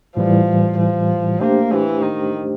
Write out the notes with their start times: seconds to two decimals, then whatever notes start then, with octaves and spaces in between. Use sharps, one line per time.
0.16 A2 E3 F3 G3
0.78 F3
1.41 A3 A#3 D4 G4 C5
1.72 E3
2.03 D#3